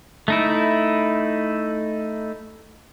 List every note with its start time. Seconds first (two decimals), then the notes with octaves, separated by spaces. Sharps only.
0.28 A3 D#4 E4